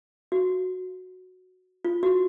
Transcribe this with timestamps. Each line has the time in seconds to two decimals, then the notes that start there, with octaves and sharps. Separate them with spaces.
0.32 F#4
1.85 F4
2.03 F#4